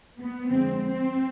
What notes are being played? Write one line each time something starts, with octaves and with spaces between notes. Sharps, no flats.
B3
F2 D3 G#3 C4
C4